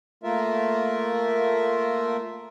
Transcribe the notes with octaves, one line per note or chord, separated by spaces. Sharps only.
A3 A#3 F4 A#4 E5